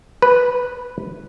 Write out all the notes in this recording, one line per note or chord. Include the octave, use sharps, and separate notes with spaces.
B4